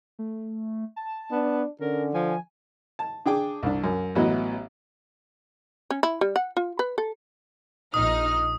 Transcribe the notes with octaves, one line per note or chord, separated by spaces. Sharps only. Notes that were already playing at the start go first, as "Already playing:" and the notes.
A3
A5
B3 D4
D3 C#4 A#4
F3 G#5
A5
D4 G#4 G5 D6
C2 D4
F#2
A1 F#3 B3 E4 D#5
C#4
E4
G3
F#5
F4
B4
A4
A#1 D#4 D#6 F6